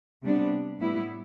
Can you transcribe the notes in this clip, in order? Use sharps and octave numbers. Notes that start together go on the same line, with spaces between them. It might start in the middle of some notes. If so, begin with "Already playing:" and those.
C3 G3 B3 D4
A2 G3 B3 E4